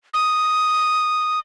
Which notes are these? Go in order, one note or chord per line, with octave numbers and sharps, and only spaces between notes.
D#6